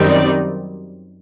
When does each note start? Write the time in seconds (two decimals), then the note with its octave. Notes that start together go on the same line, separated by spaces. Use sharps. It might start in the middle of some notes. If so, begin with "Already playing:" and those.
Already playing: F#2 D#3 G3 C4 D#4
0.09 D5